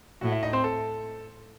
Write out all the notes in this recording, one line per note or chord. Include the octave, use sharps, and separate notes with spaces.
A2 F#4 F#5
E4 E5
D#4 D#5
C4 C5
A4